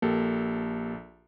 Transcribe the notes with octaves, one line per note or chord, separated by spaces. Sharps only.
A#1 A#3 G4 A4